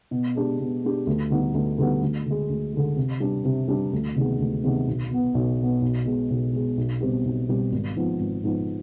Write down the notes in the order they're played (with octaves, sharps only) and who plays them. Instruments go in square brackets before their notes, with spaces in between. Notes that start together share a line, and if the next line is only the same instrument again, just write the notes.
[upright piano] B2
G#3 D4 G4
B2
G#3 D4 G4
D2
D3 G3 B3 D#4
D2
D3 G3 B3 D#4
D2
D3 G#3
D2
D3 G#3
C3
G3 D4
C3
G3 D4
D2
C3 D#3 G#3 B3
D2
C3 D#3 G#3 B3
B1
B2 B3
B1
B2 B3
B1
B2 G#3
B1
B2 G#3
B1
B2 G3 C4 G4
B1
B2 G3 C4 G4
G#1
G#2 F3 B3
G#1
G#2 F3 B3